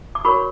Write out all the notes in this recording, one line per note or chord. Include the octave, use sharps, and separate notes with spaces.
D6
F#4 A#4 C#5 B5 C#6